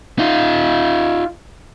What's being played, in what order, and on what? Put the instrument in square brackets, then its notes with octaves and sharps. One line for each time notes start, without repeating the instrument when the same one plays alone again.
[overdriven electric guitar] D#4 F4